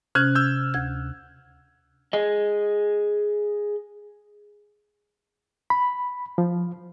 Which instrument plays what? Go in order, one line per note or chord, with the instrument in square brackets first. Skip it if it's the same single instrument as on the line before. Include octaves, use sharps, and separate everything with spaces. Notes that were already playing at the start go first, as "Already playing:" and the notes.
[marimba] C3 C#4 [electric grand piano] F6 F#6 G#6
[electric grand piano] E6 G6
[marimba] D2 G#6
[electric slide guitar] G#4 D#5
[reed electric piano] B5
F3